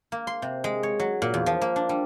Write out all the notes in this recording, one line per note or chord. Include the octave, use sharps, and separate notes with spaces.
A#3
C6
C3
G#3
C#5
F#3
A#2
E2
F3
A#3
D4
G3